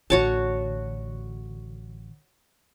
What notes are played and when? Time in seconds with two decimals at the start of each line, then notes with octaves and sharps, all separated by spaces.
0.10 A1 D3 F#4 C#5 A5